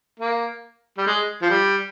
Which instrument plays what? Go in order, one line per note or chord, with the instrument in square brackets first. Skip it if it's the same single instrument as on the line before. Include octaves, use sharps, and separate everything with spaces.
[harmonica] A#3
G3
G#3
F3
G3